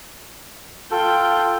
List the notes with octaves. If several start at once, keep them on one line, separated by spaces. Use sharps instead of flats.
F4 A4 G5